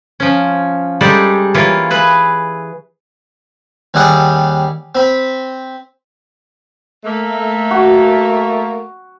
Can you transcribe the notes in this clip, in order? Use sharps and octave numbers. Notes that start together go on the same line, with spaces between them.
F3 C#4
G3 G#3 D#4 A4 C5 D5
E3 A#3 F4 C#5 E5
G#4 B4 E5
D#2 G3 G#4 F#5
C4 B5
A3 A#3
F#4